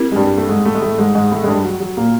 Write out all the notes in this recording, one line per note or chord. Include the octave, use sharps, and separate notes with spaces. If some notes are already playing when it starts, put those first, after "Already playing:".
Already playing: C4 E4 G4 A#4
G#3
G2 G3
A3
G#2 G#3
A2 A3
G#3
A2 A3
G#2 G#3
G#2 G#3
A2 A3
G#3
G2 G3
F#3
F#3
A#2 A#3